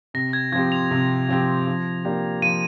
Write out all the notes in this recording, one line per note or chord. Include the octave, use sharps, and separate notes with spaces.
C3 A#6
G#6
F3 C4 G4 G#6
F7
C3
F3 C4 G4
F3
A#3 D4 G4
F3 D#7